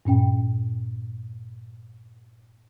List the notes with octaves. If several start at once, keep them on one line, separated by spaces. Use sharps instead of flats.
G2 A#2 C#4 G5